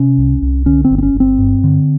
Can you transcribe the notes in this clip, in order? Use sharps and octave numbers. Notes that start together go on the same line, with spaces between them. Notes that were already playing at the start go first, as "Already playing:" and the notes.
Already playing: C3 C#4
C2
C2
D3 C#4
C4
G1
C4
C#4
G1
C4
G2
D3